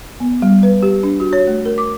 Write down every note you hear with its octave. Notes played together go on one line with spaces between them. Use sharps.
B3
G3
B4
G4
D4
F#4
C#5
A3
A#4
D6